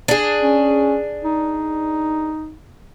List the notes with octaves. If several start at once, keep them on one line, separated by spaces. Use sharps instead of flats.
D4 G#4
C#4
D#4